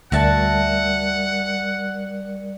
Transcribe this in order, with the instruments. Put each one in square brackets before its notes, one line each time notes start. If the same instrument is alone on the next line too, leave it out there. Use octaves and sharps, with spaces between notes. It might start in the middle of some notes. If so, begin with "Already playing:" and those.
[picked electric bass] D2 [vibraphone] G3 A#4 D5 [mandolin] F#4 E5 A5 [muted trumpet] F#5